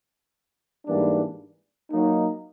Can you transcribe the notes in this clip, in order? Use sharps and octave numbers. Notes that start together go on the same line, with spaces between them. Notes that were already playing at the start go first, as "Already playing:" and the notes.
G#2 E3 G3 A#3 D4
F#3 A#3 D#4